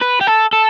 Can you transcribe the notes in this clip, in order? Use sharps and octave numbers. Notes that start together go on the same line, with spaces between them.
B4
G4
A4
A4